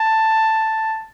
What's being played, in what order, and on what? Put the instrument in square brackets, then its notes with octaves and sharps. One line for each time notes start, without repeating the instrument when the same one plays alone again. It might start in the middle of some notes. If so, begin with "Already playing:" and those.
Already playing: [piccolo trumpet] A5